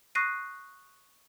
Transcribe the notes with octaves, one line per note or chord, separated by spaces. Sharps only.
C#6 D#6 F#6 A#6 C7 D#7